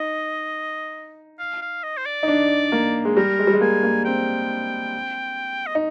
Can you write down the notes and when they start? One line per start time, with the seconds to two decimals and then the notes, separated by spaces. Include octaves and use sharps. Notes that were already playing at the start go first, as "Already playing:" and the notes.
Already playing: D#4 D#5
1.39 F5
1.61 F5
1.83 D#5
1.97 C5
2.05 D5
2.23 D#4
2.28 D4
2.72 A#3
3.05 G#3
3.17 G3 A#4
3.39 G#3
3.47 G3
3.53 G#3
3.61 A#3 G#5
3.83 A#3
4.05 C4 G5
5.67 D#5
5.75 D#4